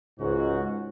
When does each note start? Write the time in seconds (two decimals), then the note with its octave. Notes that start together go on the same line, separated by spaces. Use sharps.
0.19 C#2 G#2 F#4